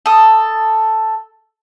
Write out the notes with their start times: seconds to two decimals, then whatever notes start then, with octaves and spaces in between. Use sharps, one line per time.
0.06 A4 D#6